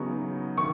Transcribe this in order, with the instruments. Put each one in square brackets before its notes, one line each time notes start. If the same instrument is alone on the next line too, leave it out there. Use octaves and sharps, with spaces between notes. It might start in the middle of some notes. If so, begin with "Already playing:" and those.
Already playing: [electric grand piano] C#3 F#3 B3 D#4 [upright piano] C#6
[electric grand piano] D#3 [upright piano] C#6